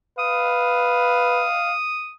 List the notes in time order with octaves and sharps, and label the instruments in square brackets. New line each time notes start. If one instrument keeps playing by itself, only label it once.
[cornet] B4 [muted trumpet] F5 [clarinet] D#6